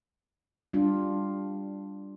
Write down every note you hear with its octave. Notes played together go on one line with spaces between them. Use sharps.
G3 D4 F4